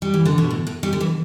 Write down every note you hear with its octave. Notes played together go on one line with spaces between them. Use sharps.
G3
E3
D3
B2
A2
A2
G3
D3
E3